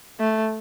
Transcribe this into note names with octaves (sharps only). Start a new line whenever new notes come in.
A3